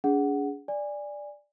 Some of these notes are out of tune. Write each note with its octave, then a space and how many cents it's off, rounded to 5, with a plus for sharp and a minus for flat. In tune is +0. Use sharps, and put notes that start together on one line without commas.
D4 -45 G#4 +0 F#5 +5
D5 +0 G#5 -20